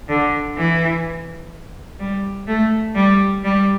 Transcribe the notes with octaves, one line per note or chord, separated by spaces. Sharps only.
D3
E3
G3
A3
G3
G3